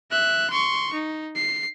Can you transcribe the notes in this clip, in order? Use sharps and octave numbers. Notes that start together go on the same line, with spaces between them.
E5 F#6
C6 C#6
D#4
C7